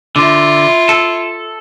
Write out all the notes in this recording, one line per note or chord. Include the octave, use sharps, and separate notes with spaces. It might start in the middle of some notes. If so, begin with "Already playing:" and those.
D3 E4 F4
A4